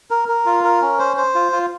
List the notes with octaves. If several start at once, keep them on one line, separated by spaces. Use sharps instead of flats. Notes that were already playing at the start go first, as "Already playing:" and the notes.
A#4
A#4
F4
A#4
C#4
C5
C5
F4
F4